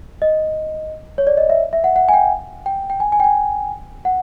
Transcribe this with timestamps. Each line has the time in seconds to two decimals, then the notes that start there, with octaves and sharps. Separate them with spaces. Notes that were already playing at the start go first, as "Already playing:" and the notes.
0.22 D#5
1.18 C#5
1.27 D5
1.37 D#5
1.50 E5
1.73 E5
1.84 F#5
1.96 F#5
2.09 G#5
2.13 G5
2.66 G5
2.90 G5
3.00 G#5
3.12 G#5
3.20 G5
3.24 G#5
4.05 F#5